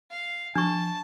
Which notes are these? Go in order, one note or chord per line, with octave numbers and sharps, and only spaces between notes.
F5
F3 D4 A5 C#6